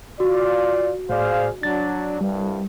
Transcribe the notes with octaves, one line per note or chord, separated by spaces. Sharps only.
F4 F#4 D5
A2 G#4 C5 D5 F5
F#3 D4 A6
C2 G2 G3